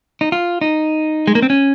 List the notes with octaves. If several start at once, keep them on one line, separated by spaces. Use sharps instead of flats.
D#4
F4
D#4
G#3
A#3
C4
C#4